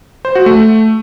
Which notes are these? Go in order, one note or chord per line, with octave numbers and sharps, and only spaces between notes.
C5
F#4
A3